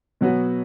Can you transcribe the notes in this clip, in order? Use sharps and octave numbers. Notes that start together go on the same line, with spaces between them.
B2 F#3 B3 F#4